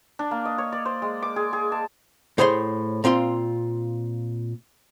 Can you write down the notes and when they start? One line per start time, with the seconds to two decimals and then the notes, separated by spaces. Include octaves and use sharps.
0.19 D4
0.31 A#3
0.45 D#5
0.58 C#5
0.72 D5
0.85 C5
1.02 G#3
1.22 D6
1.36 G#4
1.53 G#4
1.72 A5
2.38 A2 G#4 C5 C#5 F5 C6
3.04 A#2 C4 F4 C6